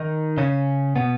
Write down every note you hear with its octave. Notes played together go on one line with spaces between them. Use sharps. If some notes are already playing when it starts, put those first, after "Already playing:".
Already playing: D#3 D#4
C#3 C#4
B2 B3